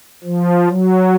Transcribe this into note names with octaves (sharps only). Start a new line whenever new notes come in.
F3
F#3